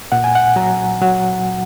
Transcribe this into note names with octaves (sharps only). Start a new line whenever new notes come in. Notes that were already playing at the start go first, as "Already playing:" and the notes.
A#2 F#5
G#5
F#5
F#3 A#5
F#3 F#5